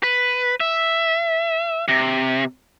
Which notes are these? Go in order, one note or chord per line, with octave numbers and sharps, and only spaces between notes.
B4
E5
C3